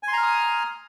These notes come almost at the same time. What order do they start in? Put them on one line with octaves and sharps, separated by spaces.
G#5 C6 A#5 F6 D#6